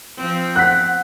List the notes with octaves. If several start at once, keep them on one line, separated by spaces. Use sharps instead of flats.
F3 C4
F#5 F#6 B6